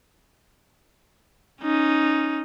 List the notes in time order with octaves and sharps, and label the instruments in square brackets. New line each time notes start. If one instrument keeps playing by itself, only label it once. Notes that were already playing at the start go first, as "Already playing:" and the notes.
[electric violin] C#4 D#4